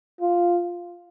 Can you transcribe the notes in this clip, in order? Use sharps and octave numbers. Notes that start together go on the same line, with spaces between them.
F4